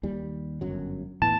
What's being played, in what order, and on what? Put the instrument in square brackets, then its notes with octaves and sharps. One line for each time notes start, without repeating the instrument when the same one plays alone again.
[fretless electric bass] D#2 G3
G1 F#2 F#3
[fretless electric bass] A2 E3 B3 [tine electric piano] A5